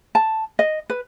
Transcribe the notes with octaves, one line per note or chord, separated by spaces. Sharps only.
A5
D#5
B4